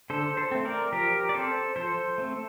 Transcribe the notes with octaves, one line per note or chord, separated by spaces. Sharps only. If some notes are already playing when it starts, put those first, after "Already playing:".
D3 A4 C5
A4 C5
A3 C4
A#4 D5
F3 G4 A#4
D5
C4 A4 C5
F3 A4 C5
A3 C4